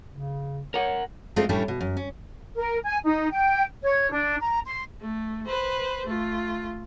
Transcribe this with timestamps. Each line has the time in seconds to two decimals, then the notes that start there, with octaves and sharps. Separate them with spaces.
0.12 C#3
0.74 A#4 C#5 F#5
1.36 G#3 A3 C4 D4 F4 G4
1.49 A2 G3 A3 C#4 D4 G4
1.68 B2
1.81 F#2
1.97 C#4
2.56 A#4
2.84 G#5
3.03 D#4
3.31 G5
3.82 C#5
4.11 D4
4.40 A#5
4.64 C6
5.01 A3
5.46 B4 C5
6.06 A3 F4